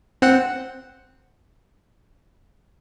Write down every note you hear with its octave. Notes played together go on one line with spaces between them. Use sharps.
C4 F#5